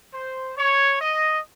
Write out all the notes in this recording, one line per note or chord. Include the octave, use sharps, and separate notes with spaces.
C5
C#5
D#5